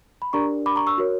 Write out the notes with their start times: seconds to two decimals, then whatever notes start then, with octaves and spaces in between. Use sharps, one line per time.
0.22 B5
0.33 D4 G4 A#4 D5 A#5 C#6
0.66 B5 D6
0.76 A#5 C#6
0.87 C#6 E6
0.98 F#4 A#4 C#5